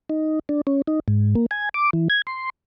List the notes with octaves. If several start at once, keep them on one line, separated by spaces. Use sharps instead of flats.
D#4
D4
C#4
D#4
G#2
A#3
G#5
D6
E3
G#6
C6